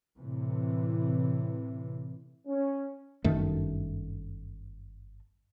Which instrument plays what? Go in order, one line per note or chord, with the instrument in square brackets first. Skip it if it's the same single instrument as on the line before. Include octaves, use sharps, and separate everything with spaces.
[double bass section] A2 C3 E3
[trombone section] C#4
[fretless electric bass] G1 F#2 D#3 A3